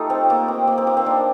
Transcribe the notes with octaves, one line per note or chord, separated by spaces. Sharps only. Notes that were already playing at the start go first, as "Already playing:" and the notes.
Already playing: A3 D#4 F4 G4 A4
C4
A#3
C4
A#3
C4
A#3
C4
D4